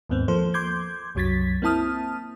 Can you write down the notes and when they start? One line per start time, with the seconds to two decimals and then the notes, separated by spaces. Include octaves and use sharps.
0.10 D#2 G#2 B3 C4
0.28 F3 A#3 A4 C5
0.54 C6 D6 G6 G#6
1.15 C2 F#2 F#3 G#6 A6 B6
1.62 A#3 C4 E4 A5 D#6 F6